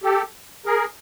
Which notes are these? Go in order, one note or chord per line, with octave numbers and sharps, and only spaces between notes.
G4 A4
G#4 A#4